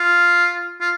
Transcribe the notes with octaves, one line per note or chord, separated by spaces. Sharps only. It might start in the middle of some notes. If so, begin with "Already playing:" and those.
Already playing: F4
F4